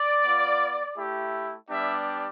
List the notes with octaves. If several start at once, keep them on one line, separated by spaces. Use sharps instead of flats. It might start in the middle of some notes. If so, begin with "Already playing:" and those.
Already playing: D5
B3 F4
A3 E4 G4
G3 B3 D4 G4 E5